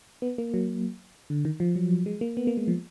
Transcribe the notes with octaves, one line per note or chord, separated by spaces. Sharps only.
B3
A#3
F#3
D3
D#3
F3
F#3
G#3
A#3
B3
A#3
G#3
F3